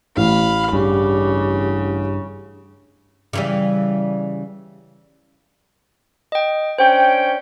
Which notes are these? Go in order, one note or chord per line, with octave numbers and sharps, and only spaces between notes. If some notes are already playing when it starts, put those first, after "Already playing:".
A1 F5 B5
G2 C#3 G4
C#3 E3 G3
D#5 G5
C#4 D4 C5 G5